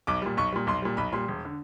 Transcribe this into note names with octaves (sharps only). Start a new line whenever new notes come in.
B1 D6
A#2 G3
B1 C#6
A#2 G3
B1 C6
A#2 G3
B1 B5
A#2 G3 C6
E1
D3